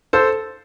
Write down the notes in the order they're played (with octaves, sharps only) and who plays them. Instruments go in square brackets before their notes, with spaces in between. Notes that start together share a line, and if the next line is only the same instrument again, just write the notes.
[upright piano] A4 C5